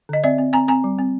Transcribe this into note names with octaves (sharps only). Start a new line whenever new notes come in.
D3 D#5
C4 D5 E5
C4
C4 G#5 A#5
C4 G#5 A#5
G3
C4